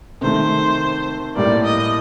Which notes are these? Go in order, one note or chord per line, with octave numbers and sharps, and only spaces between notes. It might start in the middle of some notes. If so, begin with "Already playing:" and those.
C3 D#3 A3 C5
A2 G3 A#3 D5
D#5